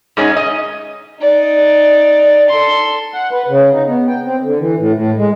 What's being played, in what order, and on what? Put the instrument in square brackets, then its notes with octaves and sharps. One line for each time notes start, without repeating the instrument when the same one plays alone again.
[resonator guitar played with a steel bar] G#2 G#3 C#4 D#4
D#5
[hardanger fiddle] D#4 D5
A4 C6
[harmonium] F#5
B4
C#3
D#4
B3
G5
C4
D3
E3
A2
A2
G#3